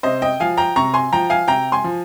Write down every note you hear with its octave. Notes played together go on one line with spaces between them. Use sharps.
C3 C5 D#5
D#5 G5
F3 F5 G#5
G5 A#5
C3 A#5 C#6
G#5 C6
F3 G5 A#5
F5 G#5
C3 G5 A#5
G#5 C6
F3